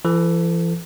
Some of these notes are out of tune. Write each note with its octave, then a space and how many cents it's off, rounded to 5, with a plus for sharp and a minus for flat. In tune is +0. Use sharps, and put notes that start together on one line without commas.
E3 +45 A4 +10